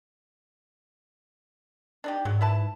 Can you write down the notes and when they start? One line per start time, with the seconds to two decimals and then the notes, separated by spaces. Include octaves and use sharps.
2.04 D4 D#4 G4
2.25 G#2 F#3
2.41 E4 B4 A5